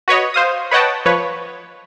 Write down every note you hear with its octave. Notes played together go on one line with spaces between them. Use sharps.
F#4 B4 C#5 D#5
C5 F5 D#6
B4 C#5 D#5 F#5 G5 A5
F3 B4 C#5